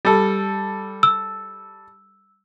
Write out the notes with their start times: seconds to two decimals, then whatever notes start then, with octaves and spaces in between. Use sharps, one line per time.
0.05 G3 A4
1.03 E6